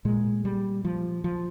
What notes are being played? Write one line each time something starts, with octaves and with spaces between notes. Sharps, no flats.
A#2 G#3
G3
F3
F3